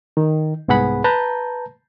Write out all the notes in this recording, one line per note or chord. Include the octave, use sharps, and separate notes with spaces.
D#3
C2 G#2 B3 G#4 F#5 B5
B4 A5 A#5 G6